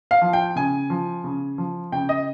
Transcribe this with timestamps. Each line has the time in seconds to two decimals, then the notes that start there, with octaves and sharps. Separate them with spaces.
0.11 F5
0.22 F3
0.33 G5
0.56 C#3 G#5
0.90 F3
1.24 C#3
1.58 F3
1.92 C#3 G5
2.09 D#5